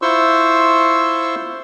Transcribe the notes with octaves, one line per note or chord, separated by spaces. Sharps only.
E4 F4 C5 C6 C#6 E6